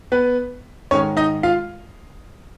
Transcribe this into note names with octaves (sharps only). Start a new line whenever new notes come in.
B3 B4
G#2 D#3 G#3 C#4 C#5
D#4 D#5
F4 F5